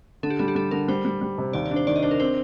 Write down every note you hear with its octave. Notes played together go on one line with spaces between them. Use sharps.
D3 A4
G4
G3 A4
G4
G3 A4
D3 A#4
G3 C5
G3
G3
C3
D#2 D5
D5
D4
C5
D#3 D5
D#5
D4 C5
A#4
C4 C5